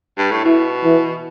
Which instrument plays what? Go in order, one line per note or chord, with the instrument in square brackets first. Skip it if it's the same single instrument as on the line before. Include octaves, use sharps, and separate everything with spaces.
[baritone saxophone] G2
A2
[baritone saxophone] B2 [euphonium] E4
[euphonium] E3